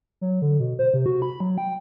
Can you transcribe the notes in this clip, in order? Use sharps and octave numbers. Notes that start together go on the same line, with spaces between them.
F#3
D3
B2
C5
C3
F#4
B5
F#3
G5